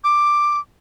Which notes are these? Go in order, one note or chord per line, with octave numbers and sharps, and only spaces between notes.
D6